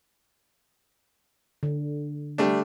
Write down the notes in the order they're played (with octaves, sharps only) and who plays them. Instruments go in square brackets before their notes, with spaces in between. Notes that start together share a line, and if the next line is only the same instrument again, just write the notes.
[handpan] D3
[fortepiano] G3 A3 D4